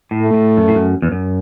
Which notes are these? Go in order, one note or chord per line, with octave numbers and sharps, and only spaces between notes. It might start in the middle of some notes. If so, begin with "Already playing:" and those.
A2
A3
A2
F#2
A2
F#2
E2
F#2